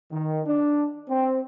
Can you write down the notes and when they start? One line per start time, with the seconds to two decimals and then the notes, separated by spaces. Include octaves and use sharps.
0.12 D#3
0.46 D4
1.09 C4